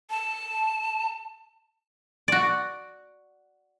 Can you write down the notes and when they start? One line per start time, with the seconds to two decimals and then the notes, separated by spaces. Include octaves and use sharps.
0.10 A5
2.28 F#4 D5